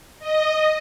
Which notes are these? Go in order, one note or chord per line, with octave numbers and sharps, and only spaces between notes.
D#5